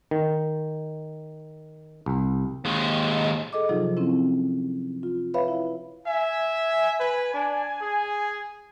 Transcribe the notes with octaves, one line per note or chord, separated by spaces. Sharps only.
D#3
C2
D#2 G#3
G#4 A4 D#5 D6
C3 F3 F#3 D#4 F4 G#4
C4 C#4 E4
F4
B4 C#5 E5 F5 B5
E4
E5 G#5
B4
D4
G#4